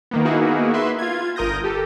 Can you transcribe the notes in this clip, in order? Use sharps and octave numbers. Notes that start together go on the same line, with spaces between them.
D#3 A#3 B3
A#3 B3 D#4 E4 F#4 G#4
B4 E5 C6
F4 G#6
G1 A#4 D#6 G6 A#6
G4 A4